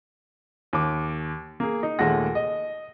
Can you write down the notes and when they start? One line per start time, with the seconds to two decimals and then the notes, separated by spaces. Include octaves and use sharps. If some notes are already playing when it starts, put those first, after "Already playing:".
0.73 D#2 D6
1.60 A#3 G#4
1.83 D#4
1.99 D#2 A#2 G#3 A3 F#5 A#6
2.35 D#5